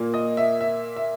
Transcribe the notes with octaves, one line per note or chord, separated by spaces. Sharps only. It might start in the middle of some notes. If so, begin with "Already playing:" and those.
Already playing: A#2 A#3
D#5
E5
E5
E5